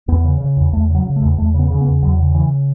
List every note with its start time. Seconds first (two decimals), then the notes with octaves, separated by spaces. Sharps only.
0.08 E2 B3
0.24 C#3
0.40 C#3
0.57 E2
0.73 E2 A3
0.89 C#3
0.95 F#3
1.06 C#3
1.16 A3
1.21 E2
1.38 E2 A3
1.54 C#3 B3
1.70 C#3
1.81 B3
1.87 E2
2.03 E2 F#3
2.19 C#3
2.35 C#3 E3